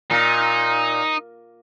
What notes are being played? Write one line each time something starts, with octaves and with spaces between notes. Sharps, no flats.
A#2 D#4